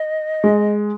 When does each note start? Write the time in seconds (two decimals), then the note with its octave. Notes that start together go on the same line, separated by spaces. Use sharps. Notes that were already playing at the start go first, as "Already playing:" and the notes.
Already playing: D#5
0.44 G#3